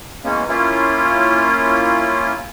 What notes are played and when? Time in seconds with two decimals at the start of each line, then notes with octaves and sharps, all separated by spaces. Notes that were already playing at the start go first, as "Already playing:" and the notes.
0.24 E3 G#3 A#3 B3 C#4
0.48 A#3 C#4 E4 F4